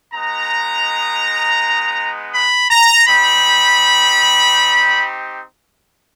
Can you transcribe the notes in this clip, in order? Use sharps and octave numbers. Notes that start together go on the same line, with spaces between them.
G#3 B3 D#4 A#5
B5
A#5
C4 D#4 G4 B5